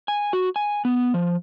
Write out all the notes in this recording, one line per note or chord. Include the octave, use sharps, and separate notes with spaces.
G#5
F#4
G#5
B3
F3